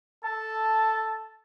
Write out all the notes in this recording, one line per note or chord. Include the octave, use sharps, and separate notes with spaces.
A4 A5